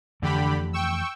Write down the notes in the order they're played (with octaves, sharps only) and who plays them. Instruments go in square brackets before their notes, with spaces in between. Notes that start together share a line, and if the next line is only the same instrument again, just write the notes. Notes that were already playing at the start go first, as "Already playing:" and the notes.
[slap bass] F2 E3 A3 [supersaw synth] D3 G4 B5
[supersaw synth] G5 C#6 E6